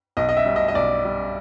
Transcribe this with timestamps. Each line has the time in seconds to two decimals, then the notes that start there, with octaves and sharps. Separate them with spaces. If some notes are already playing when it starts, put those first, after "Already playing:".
0.17 B1 D#5
0.29 D#5
0.37 E5
0.46 G3
0.56 D#5
0.68 D#5
0.75 B1 D5
1.05 G3